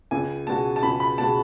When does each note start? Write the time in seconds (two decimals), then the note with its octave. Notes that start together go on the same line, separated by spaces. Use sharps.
0.11 C#2 G#5
0.46 B2 G#3 B3 F#4 A5
0.76 A5
0.83 C#2 B5
1.00 B5
1.18 B2 G#3 B3 F#4 A5